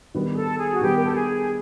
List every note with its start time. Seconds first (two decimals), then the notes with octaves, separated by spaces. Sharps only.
0.15 D#3 G3 B3
0.33 G#4
0.37 A4
0.58 G#4
0.71 F#4
0.81 D#3 G3 B3 G4
0.93 A#4
1.04 A4
1.15 G#4